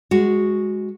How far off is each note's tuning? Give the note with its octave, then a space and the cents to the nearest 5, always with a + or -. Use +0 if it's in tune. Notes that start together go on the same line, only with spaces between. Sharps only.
G#3 +0 F#4 +0